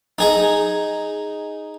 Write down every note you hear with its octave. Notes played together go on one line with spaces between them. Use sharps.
D#4 G#4 A#5